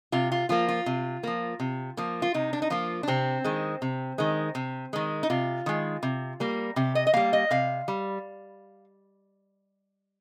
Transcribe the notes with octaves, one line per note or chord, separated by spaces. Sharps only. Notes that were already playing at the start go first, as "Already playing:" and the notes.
C3 F4
F4
F3 A#3 F4
F4
C3
F3 A#3
C3
F3 A#3
F4
C3 D#4
D4
D#4
F3 A#3 F4
D4
C3 C4
D#3 G#3
C3
D#3 G#3
C3
D#3 G#3
D#4
C3 F4
D#3 G#3
C3
G3 A#3
C3 G4
D#5
D#5
G3 A#3 F5
D#5
C3 F5
G3